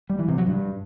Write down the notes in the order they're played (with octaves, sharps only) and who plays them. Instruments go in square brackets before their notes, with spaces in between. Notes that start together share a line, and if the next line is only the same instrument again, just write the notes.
[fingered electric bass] G3
E3
C3
F#3
G2